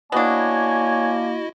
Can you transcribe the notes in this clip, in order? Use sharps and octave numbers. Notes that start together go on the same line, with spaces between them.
A#3 B3 D4 E4 F#4 C#5 D#5 G#5